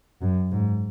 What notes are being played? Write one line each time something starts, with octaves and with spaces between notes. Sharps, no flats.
F#2
G#2